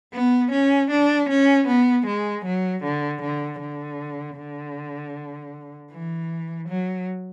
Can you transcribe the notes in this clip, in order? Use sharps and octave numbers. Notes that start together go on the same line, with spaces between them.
B3
C#4
D4
C#4
B3
G#3
F#3
D3
D3
D3
D3
E3
F#3